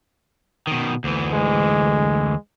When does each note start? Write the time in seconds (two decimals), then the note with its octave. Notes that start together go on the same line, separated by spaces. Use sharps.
0.67 B2 D#3
1.04 D2 E3
1.33 G#3